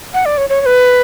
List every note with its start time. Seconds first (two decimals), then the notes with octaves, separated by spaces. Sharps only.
0.14 F#5
0.25 D5
0.37 C#5
0.49 C#5
0.61 C#5
0.66 B4